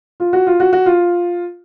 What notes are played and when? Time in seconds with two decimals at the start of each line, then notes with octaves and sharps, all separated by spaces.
0.20 F4
0.33 F#4
0.47 F4
0.60 F#4
0.73 F#4
0.86 F4